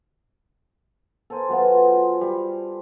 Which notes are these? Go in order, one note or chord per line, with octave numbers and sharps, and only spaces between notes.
A4 A#4 C5 G#5
F#3 B3 F4
C5
G3